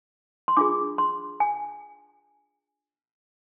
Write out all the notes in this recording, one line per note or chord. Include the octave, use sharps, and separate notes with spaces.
C6
D4 F4 G#4 D6
C6
G#5